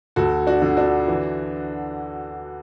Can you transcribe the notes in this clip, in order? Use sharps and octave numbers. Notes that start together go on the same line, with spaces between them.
D2 F#4 A4
D4 F#4
D3
D4 F#4
E3